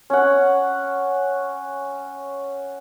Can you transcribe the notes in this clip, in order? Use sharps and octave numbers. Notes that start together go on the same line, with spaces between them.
C#4 F#5